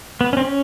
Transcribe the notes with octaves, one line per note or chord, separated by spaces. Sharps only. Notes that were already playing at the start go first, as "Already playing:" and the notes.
B3
C#4
C4
C#4